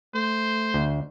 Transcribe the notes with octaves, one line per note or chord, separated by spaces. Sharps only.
A3 C5
D2